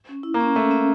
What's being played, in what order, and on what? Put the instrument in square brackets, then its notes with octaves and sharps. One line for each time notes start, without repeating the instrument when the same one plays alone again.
[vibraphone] C#4
E4
[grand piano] A#3
[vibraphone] C#4
[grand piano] A3 [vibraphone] C#4
[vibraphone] C#4